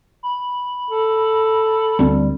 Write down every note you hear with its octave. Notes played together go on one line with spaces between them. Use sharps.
B5
A4
D2 G3 C4